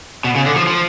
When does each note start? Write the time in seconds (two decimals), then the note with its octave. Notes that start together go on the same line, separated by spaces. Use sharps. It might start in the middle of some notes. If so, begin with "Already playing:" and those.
0.24 B2
0.35 C#3
0.46 D3
0.56 F3
0.67 F3